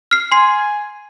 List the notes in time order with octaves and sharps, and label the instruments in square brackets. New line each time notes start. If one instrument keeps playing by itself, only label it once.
[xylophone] F6 C7
[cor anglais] G#5 [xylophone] C6 C7